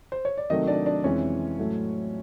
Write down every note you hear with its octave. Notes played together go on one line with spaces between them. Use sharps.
C5
C#5
D5
C3 D#3 F#3 A3 D#4 D#5
D4 D5
D4 D5
F2 C3 E3 G#3 C#4 C#5
A2 F#3 A3